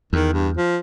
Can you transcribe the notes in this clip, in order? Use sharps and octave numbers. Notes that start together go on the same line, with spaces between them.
E2 D#3
G2
F3